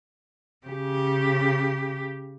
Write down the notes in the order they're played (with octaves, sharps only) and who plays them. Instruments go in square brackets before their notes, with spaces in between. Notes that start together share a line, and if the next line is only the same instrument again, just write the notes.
[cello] C#3 G4